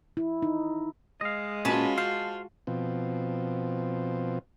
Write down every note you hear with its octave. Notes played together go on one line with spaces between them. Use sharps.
E4
D#4
G#3 D#5 F5
A#2 C#4 F4 F#4 B4 A5
C5 F5 A5
B2 F3 C4